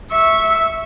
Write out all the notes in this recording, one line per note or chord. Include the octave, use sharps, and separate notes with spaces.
E5 C#6